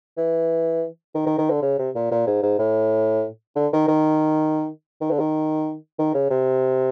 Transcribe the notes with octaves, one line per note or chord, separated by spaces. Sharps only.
E3
D#3
D#3
D#3
D3
C#3
C3
A#2
A#2
G#2
G#2
A2
D3
D#3
D#3
D#3
D3
D#3
D#3
C#3
C3